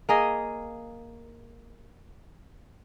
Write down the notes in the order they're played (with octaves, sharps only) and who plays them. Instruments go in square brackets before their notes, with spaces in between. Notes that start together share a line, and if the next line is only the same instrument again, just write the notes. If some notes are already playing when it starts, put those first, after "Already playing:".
[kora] A#3 G#4 D#5